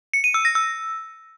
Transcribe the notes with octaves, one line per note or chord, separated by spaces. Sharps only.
C#7
D#7
E6
A#6
E6